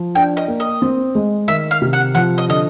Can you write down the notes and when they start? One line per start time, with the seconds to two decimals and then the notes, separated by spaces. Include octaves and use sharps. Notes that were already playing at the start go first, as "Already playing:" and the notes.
Already playing: F3
0.15 D4 G5
0.37 D#5
0.48 A#3
0.60 D#5
0.82 C4
1.15 G#3
1.48 D#3 E5
1.71 F5
1.82 C3
1.93 F#5
2.15 F3 F#5
2.38 D#5
2.49 D3 D#5